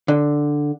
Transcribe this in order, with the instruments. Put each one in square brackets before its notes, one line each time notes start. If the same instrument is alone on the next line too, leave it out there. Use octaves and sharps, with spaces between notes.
[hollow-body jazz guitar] D3